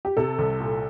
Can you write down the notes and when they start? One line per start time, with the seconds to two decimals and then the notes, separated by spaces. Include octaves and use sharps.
0.05 G4
0.17 C3 A4
0.39 C2
0.60 A#2